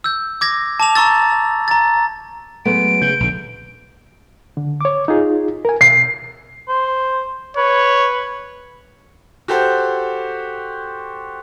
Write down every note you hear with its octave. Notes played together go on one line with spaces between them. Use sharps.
E6 G6
D6 G#6 A#6
A5 D6 F7
A5 A#5 C#6 E6 A6
A#5 A6
F#3 G#3 A3 B3 D7
C#3 G6
A#1 D3
D3
C#5 D6
D#4 F4 G#4
A#4 G#5
B2 C7
C5
B4 C#5
F#4 G4 A4 C5